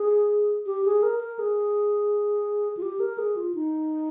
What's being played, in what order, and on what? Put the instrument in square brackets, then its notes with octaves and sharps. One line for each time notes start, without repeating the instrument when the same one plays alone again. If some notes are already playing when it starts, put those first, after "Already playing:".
Already playing: [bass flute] G#4
G4
G#4
A#4
A#4
G#4
F4
G4
A#4
G#4
F4
D#4